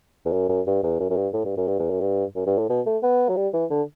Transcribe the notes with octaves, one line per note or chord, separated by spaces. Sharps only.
E2
F#2
F#2
G2
E2
F#2
F#2
G2
A2
G2
F#2
G2
E2
F#2
G2
F#2
G2
A2
B2
A3
B3
F#3
G3
E3
D3